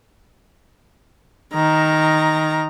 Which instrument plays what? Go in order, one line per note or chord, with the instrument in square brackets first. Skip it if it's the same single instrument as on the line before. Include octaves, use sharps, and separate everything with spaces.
[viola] D#3 A#5